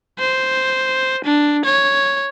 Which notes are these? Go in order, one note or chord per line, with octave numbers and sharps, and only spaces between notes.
C5
D4
C#5